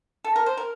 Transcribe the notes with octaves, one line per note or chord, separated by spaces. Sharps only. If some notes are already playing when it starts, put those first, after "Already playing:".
A4
A#4
C5
A#4